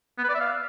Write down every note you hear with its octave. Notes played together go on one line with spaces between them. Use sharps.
B3
B4
D5
E5
F5